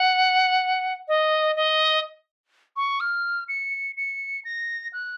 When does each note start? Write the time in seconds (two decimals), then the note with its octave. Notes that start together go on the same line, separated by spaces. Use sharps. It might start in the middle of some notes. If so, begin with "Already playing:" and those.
Already playing: F#5
1.08 D#5
1.56 D#5
2.76 C#6
3.00 F6
3.48 C#7
3.97 C#7
4.44 A#6
4.93 F#6